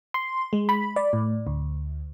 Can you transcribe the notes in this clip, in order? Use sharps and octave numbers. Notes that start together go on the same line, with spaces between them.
C6
G#3
B5
D5
A2
D2